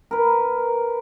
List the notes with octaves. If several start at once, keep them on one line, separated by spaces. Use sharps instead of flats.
A#4 B4